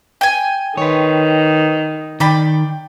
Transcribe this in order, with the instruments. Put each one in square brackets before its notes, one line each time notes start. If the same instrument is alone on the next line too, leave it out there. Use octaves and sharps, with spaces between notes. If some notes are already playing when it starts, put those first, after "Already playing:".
[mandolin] G5 G#5
[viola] D#3 [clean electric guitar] B4 C#5
[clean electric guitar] D#3 [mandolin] D5 G5 B5